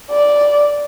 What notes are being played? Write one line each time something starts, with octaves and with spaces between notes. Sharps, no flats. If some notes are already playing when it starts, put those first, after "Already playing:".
D5